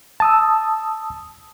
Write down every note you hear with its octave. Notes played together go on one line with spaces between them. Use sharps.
A5 D#6 E6